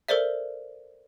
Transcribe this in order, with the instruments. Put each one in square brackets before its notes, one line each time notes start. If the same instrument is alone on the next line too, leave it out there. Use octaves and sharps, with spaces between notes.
[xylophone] A4 A#4 C5 D5 E5